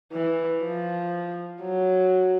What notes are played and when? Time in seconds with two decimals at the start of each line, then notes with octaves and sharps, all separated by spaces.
0.12 E3
0.63 F3
1.62 F#3